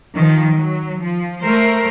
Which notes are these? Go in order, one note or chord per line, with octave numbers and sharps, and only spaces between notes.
D#3 F3
F#3
F3
A3 A#4 C5